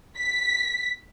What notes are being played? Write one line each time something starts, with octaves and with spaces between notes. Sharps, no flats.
B6